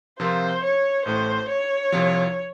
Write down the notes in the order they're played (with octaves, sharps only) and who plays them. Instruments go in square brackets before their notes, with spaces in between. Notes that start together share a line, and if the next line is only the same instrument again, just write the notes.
[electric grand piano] C3 F3 C4 F4 A#4 [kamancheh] C5
[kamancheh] C#5
[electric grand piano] A1 A2 A3 [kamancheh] C5
[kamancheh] C#5
[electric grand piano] C2 C3 F3